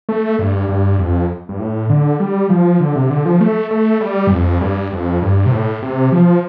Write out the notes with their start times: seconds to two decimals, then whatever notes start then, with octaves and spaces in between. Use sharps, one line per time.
0.09 A3
0.39 G2
0.69 G2
0.99 F2
1.49 G2
1.60 A2
1.90 D3
2.20 G3
2.50 F3
2.80 D3
2.96 C3
3.10 D3
3.25 F3
3.41 A3
3.71 A3
4.01 G3
4.27 G2
4.31 F2
4.61 G2
4.92 F2
5.22 G2
5.46 C3
5.52 A2
5.82 C3
6.12 F3